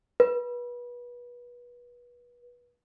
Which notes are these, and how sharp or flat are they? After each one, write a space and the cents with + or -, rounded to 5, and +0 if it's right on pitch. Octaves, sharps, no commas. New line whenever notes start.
B4 -30